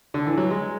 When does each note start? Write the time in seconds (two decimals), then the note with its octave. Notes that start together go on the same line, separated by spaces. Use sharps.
0.14 D3
0.27 E3
0.37 F#3
0.51 G#3